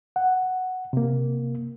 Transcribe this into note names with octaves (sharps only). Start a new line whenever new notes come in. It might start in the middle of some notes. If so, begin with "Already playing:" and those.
F#5
C3 A#3